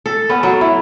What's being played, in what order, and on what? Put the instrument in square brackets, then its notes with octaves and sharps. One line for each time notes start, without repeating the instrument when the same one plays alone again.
[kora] A4
B3 C#4 A4
F#3
E4